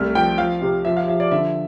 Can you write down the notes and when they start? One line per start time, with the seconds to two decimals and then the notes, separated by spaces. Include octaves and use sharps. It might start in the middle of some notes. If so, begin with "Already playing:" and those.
Already playing: C2 A3 F6
0.15 F3 G5
0.38 F3 F5
0.62 C3
0.85 F3 E5
0.97 F5
1.08 F3 E5
1.20 D5
1.31 D3 E5